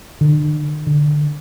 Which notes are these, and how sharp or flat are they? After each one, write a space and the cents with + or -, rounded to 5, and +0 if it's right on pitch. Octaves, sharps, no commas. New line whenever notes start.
D3 +40
D3 +15